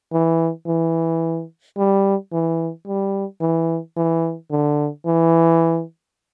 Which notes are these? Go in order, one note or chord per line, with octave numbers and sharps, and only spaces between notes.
E3
E3
G3
E3
G3
E3
E3
D3
E3